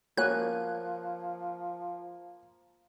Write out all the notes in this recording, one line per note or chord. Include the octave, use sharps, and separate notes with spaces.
F3 A#3 F#4 C#5 G#5 F#6